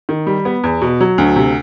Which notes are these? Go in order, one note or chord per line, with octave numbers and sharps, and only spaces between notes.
D#3
G3
B3
E2
B2
F#3
D2
C3